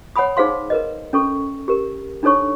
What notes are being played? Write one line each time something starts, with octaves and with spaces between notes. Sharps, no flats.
C#5 F#5 G#5 B5 D#6
D#4 G#4 C5 F5 C6
A#4 B4 D#5
C#4 A4 C#6
G4 A#4
D4 D#4 A4 C#5 C#6